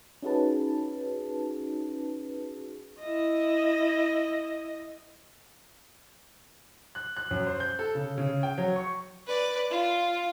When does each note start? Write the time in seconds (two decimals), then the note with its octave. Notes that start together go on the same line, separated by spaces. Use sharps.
0.22 C#4 D#4 F#4 G#4 B4 A5
2.99 E4 D#5
6.95 F#6
7.16 F#6
7.31 F#2
7.47 C5
7.60 G6
7.79 A4
7.95 C#3
8.18 C#3
8.43 G5
8.58 F#3
8.76 C#6
9.26 B4 D5
9.70 F4